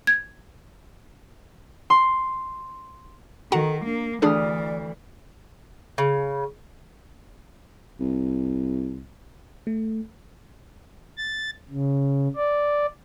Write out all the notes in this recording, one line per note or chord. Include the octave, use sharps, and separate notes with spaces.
G#6
C6
D#3 F#4 A4 F#5 A#5
A#3 D4
D2 E3 D4 G#4 A4 D5 D#6 F6
C#3
C2
A3
A6
C#3
D5